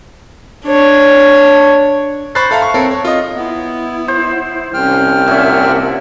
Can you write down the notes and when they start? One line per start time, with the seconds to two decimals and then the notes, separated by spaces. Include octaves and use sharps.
0.66 D4 C#5
2.35 C5 B5 C#6 F#6 A6 C7
2.51 A4 E5 F5 A#5
2.62 C#6
2.74 C4 A4 A#4 C#5
2.91 C#5
3.05 F4 D#5
3.36 B3 E4
4.08 C5
4.74 C2 C#4 G5 F6
5.28 A#2 C#4 E5 F#5